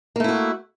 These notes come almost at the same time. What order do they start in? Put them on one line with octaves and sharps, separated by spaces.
A#3 A3 E4 F#4